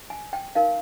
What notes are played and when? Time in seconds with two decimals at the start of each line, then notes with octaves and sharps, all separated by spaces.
0.10 G#5
0.33 G5
0.55 D#4 A#4 F5